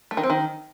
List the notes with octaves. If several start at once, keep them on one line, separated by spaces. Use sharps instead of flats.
A3
D#3
C4
D#3